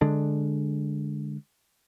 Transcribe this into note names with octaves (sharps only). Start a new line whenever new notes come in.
D3 G#3 D4